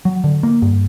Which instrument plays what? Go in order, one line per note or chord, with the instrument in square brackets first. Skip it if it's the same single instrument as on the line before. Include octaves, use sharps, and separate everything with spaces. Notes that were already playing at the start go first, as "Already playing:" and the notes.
[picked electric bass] F#3
D3
A#3
G2